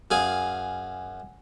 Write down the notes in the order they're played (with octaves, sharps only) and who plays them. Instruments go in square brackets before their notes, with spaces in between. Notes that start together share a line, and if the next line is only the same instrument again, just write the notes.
[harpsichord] F#2 G#4 F5 G#5